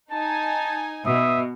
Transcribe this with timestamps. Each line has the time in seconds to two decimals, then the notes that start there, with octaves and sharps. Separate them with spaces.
0.11 D#4 G#5 A5
1.06 B2 E5 D#6